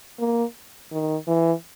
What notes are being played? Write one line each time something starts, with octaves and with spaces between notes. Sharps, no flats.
A#3
D#3
E3